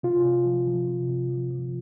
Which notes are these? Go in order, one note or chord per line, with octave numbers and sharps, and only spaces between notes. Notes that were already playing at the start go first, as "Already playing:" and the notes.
C3 F4
C3
F3
F3
C3
C3
F3
F3